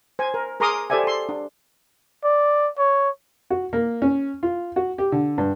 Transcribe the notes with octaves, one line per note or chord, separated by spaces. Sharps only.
C5 G#5
A#4
G#4 A#4 A#5 C6 D6 D#6
G4 A4 C5 D5 E5 G#5
A4 C6
D4
D5
C#5
F#4
A#3
C#4
F4
F#4
G4
D3
G2